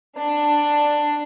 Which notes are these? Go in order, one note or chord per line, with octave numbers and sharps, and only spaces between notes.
D4